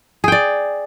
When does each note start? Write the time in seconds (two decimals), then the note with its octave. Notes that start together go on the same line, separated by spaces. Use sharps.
0.24 G#4
0.28 G5
0.32 D5